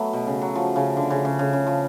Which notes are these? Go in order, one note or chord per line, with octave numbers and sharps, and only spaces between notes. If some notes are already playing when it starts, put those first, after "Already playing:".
Already playing: F#3 A3 B3
B2
C#3
F#3
F3
C#3
D3
C#3
C#3
C#3
C#3
F3